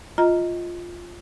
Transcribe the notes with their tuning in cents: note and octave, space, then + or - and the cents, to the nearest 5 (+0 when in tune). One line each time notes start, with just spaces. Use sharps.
F4 +0 D#5 +20 A#5 +0